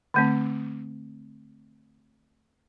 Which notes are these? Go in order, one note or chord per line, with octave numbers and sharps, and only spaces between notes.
D3 A3 C4